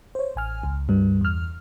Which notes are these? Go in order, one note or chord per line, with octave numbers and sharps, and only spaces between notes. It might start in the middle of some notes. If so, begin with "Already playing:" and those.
C5 C#5
A1 G#5 F6
C#2
C#2 G2 G3
E2 F6